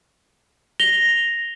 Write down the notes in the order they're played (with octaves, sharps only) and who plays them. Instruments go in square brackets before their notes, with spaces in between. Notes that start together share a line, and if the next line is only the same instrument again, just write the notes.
[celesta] A#6 F7 G7